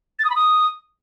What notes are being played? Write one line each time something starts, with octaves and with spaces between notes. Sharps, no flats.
A6
D#6
B5
D#6